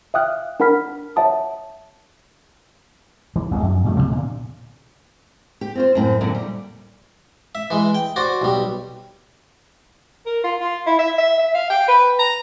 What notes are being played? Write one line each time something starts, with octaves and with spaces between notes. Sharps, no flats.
E5 F5 G5 D#6 F6 F#6
D4 A#4 F#5 B5 F6 B6
C#5 E5 F#5 A5 D#6
E3
A1 D2 G3 G#3
F#2
G2 A3
D1 F2 C3
A#2 D3
G4
C4 F4 C5
F#2 A2 C4
F#2 A#2 D3 F#3
G3
E5
E3 G#3
G5
F#4 C5 D5
B1 G3
A#4
F4
F4
E4
E5
E5
E5
F5
G5
B4
A#5